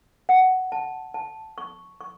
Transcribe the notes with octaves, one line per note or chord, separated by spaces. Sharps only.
F#5
A5
A5
C#6
C#6